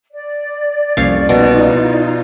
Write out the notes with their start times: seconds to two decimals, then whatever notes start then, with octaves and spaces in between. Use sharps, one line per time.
0.13 D5
0.97 C2 F2 A#3 C#4 C#5 F5
1.29 B2 D#4 F4 A#4
1.70 E4